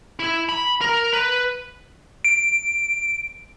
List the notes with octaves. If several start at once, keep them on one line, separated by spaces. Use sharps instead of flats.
E4
B5
A#4
B4
D7